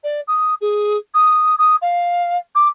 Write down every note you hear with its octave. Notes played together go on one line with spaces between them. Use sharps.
D5
D#6
G#4
D#6
D#6
F5
D6